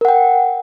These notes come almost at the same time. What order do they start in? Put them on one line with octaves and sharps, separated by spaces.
A#4 F#5 G5